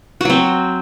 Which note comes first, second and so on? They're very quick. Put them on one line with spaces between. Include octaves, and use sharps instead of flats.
F#4 F#3 C4